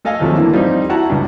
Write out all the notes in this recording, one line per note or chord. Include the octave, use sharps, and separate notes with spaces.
A3 A4 D#5 F5 G#5
D#2 C3 F3 F#3 A3
D3 E3 A#3
F3 G3 C4 D#4
E4 F#4 F#5 A5 A#5
C#2 G2